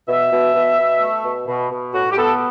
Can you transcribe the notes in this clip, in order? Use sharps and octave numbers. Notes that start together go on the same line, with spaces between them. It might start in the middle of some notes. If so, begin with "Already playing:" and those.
B2 E5
B2
B2
B2
A3
B2
B2
B2
A2 F#4
G4
B3 A4